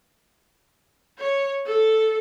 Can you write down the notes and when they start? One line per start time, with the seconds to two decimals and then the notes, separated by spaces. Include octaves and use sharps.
1.18 C#5
1.66 A4